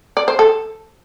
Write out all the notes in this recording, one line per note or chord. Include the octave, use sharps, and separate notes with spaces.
D5
C5
A4